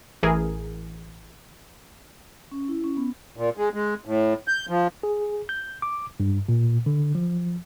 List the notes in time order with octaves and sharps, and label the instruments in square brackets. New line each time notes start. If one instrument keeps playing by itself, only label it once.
[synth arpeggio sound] A1 E3 G#4 A#4
[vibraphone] C#4
E4
C#4
B3
[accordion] A#2
G#3
G#3
A2
G6
F3
[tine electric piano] G#4
G6
D6
G2
A#2
D3
F3